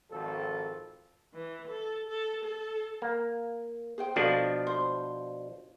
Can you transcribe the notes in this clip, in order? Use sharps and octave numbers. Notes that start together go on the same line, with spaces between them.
G#1 F3 A4
E3
A4
A4
A4
A#3
G#4 C5 G5
B2 F3 D4 A4 F5
C5